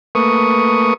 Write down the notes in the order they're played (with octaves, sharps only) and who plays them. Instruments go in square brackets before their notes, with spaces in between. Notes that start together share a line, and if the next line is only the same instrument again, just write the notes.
[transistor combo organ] A3 A#3 B4 C#6 D#6